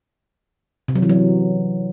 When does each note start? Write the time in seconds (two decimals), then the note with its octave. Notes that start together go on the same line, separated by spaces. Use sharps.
0.88 C3
0.95 F#3
1.02 E3
1.09 F#3